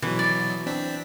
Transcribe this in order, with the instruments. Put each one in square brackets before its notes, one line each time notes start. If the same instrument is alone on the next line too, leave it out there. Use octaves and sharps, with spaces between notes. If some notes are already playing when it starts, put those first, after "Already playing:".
[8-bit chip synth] B2 F#3 [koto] E3
[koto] D5
[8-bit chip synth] C4 D4 B6